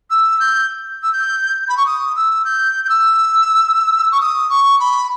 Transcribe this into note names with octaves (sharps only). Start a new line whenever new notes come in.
E6
G6
E6
G6
B5
C#6
D#6
E6
G6
G6
E6
C#6
D#6
C#6
B5